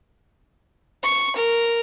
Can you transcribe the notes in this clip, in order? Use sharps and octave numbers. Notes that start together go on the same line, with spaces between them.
C#6
A#4